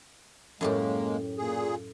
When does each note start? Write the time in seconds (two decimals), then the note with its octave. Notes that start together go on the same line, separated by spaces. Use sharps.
0.61 F#2 A2 G#3 A#3 G4
1.38 A#2 G#4